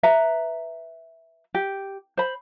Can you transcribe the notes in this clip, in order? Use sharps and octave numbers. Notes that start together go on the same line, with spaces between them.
B4 E5 A#5
G4
C5 B5